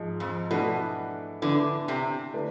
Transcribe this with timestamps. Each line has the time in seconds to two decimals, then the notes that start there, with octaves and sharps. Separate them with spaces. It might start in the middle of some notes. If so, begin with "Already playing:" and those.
Already playing: G#2 F3 G#3
0.20 F2
0.50 B2 E3 A3 D4
1.42 D3 E3 B3 D4
1.88 C3
2.33 D3 A3 E4 B4 D5